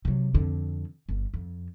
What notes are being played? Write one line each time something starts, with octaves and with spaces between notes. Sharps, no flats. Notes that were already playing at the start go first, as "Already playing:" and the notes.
C3 F#3
F2 D3
G1
F2